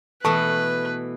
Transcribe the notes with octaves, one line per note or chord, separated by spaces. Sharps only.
B2 E3 A3 A4 B4 A5 C#6